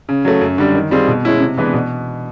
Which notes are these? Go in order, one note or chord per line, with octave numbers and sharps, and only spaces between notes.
C#3
F#3 A3
F#2
D3 G3
D#3
G3 C4 F4 G#4
B2
G#3 C#4 E4
C3
E3 G#3 B3 D4
B2